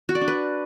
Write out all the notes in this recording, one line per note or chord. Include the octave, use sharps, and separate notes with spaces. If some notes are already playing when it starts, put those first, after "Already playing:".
F#4
D5
D4
B4